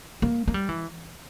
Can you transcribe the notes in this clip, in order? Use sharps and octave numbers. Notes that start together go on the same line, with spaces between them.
A#3
A#3
G3
E3